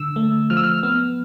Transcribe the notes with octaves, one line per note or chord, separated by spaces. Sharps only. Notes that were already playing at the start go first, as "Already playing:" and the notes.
Already playing: D3 E6
A3
F3 F6
E6
F6
B3